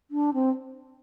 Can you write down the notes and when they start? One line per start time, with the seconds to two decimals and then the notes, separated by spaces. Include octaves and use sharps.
0.11 D4
0.34 C4